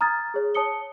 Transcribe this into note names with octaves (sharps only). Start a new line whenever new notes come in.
A#5 D#6 F6 G#6 A6
G#4 C#5
C#5 A5 D#6 C#7 G7